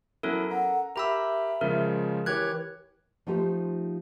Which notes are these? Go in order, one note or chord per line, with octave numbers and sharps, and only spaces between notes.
F#3 B3 C#4 E4 A4 A#4
F#5 A#5
G4 A#4 E5 A#5 B5 E6
C#3 F3 G#3 A#4
E3 G4 A#4 C#5 F#6 G#6
F3 A3 D#4 F4 G4 C5